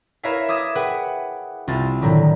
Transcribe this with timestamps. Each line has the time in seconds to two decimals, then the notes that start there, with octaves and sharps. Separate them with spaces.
0.23 E4 A#4 B4 C#5 E5 F5
0.48 E5 D6 D#6 G#6 E7
0.75 G#4 B4 F#5 G5
1.67 C2 F4 A6
2.02 A2 D3 D#3 F#3 G3